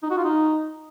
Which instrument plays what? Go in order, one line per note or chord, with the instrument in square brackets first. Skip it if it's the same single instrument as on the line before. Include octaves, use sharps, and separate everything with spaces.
[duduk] D#4
F#4
F4
D#4